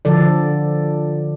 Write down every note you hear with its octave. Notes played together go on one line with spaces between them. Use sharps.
D3 F3 A4 D5